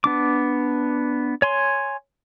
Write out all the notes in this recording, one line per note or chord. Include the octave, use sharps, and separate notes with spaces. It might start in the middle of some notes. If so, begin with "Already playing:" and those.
B3 D4 D6
C#5 G#5 C6